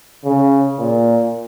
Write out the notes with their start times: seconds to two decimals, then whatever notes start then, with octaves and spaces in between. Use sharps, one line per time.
0.25 C#3
0.79 A#2